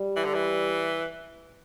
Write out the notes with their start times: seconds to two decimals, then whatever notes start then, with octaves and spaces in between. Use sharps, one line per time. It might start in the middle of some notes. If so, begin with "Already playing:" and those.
Already playing: G3
0.16 E3
0.25 D3
0.35 E3